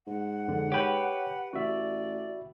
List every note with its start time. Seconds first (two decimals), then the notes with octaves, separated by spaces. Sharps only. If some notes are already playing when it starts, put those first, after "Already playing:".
0.07 G#2 F#5
0.48 F2 D3
0.72 G4 B4 C#5 G5
1.53 A1 F#4 D5 E5